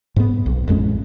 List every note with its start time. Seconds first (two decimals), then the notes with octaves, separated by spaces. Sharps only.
0.16 G#2 B3
0.46 B1
0.68 A1 F2 G#3 C#4